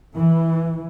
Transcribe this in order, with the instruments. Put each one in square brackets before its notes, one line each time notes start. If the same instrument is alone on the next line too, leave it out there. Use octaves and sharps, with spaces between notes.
[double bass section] E3